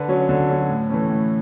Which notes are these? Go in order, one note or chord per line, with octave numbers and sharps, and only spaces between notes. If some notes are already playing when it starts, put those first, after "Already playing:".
Already playing: D3 B4
F#3 C#4
D3
F#3 C#4
A2
E3 A3 C#4
A2